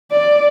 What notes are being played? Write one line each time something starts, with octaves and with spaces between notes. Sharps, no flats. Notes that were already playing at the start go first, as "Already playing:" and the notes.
D5